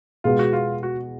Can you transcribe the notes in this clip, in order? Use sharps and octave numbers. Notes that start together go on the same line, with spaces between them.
B2 G#3 B3 F4
F#4
F4
F#4